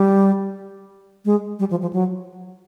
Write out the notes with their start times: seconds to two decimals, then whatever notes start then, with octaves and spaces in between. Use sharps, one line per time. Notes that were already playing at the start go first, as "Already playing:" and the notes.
Already playing: G3
1.25 G#3
1.59 G3
1.71 F3
1.82 F3
1.93 F#3